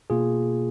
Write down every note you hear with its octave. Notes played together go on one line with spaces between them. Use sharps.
B2 A#3 F4 G#4